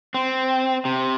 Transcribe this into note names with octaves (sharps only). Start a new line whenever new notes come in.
C4
C3